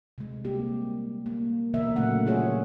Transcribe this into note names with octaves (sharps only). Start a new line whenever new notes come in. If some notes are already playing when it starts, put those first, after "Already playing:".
C3 G#3
G3 A#3 C4 G4
A#3
B2 D3 E3 A#3 A#4 E5
A#2 C#3 F#3 A3 C#4 F#5
G3 F4 G#4 C#5 F#5